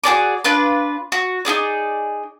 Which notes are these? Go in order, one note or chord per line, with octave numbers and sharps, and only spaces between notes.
F#4 G#4 D5 D6
D4 F4 B4
F#4
D#4 E4 G#4 D5